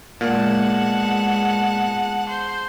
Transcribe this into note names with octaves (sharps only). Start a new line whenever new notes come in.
A#2 G#3 B3 G#4 F#5 A5
C5